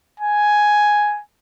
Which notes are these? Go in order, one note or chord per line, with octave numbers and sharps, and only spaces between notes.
G#5